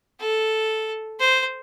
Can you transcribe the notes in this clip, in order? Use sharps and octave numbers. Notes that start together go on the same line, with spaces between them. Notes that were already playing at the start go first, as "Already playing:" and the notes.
A4
C5